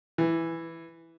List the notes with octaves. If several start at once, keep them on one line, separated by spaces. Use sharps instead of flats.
E3